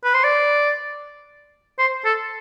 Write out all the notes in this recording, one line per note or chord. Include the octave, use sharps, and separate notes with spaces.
B4
C5
D5
C5
A4